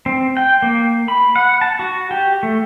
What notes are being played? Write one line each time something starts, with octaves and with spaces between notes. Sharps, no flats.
C4
G5
A#3
B5
F#5
A5
F#4
G4
A3